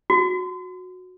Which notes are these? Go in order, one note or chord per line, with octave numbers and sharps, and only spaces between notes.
F#4